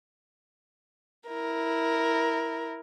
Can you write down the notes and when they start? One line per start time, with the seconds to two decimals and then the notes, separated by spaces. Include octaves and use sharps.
1.28 E4 A#4